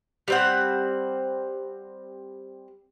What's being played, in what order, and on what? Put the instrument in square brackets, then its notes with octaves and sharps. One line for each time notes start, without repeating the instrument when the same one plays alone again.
[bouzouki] G3 C4 F#5